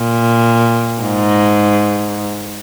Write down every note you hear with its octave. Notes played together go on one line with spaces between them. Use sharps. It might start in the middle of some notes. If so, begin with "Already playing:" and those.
Already playing: A#2
G#2